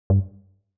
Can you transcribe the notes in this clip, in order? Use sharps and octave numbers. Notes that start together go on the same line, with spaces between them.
G2